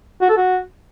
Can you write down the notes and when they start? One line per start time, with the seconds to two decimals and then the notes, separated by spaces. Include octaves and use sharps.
0.21 F#4
0.29 A4
0.37 F#4